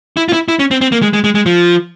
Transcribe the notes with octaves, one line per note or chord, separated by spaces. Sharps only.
E4
F4
E4
E4
C#4
C4
C4
A#3
G#3
G#3
G#3
G#3
F3